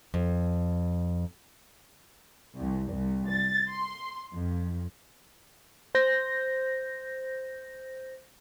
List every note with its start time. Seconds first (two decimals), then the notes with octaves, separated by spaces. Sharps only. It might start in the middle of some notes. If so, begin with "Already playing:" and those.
0.14 F2
2.56 C2
2.90 C2
3.28 A6
3.69 C6
4.33 F2
5.95 C5 G6 A#6